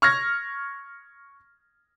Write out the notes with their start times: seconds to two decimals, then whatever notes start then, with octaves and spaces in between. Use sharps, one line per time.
0.02 C#6 F6 G#6 A#6